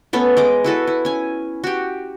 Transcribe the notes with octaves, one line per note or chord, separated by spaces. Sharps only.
A3 B3 C#4 A4
G#3 D#5 D6
E4 F#4 A4 B4
E4
C#4 G#5
F#4 G4